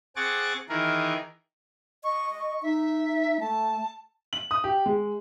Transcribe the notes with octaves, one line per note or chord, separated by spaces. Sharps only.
C4 G#4 F#5 C#6 D6 A6
D#3 E3 G#4 A#4
D#5 C#6
C#6
D#4 E5
A3 A5
F#7
D#6
G4
G#3